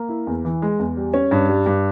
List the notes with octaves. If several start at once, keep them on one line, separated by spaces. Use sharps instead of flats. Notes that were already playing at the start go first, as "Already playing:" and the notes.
Already playing: A#3
E4
E2
E3
G#3
E2
G3
C#4
G2
G3
G2